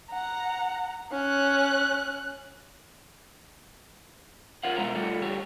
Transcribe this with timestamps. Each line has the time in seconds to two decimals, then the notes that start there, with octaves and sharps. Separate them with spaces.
0.11 F#5 A#5
1.12 C#4 F#6
4.63 F4 A#4 C#5 F5 F#5
4.77 B2 G#3 E4 C5 A#5
4.95 G3 A3 F4 F#4 A4 C#5
5.22 G2 D3 G4 C#5